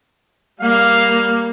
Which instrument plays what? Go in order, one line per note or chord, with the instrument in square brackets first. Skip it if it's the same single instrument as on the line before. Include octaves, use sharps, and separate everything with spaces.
[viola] G3 A#3 [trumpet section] F5